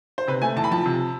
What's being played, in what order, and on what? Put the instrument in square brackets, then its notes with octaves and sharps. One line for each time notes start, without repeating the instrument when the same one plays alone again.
[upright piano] C5
C3 B4
A3 G#5
E2 A5
B5
F3 A5
C3